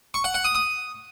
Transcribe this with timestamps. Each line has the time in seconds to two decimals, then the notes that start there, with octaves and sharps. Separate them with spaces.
0.14 C#6
0.24 F#5
0.34 F#5
0.45 D#6
0.55 D#6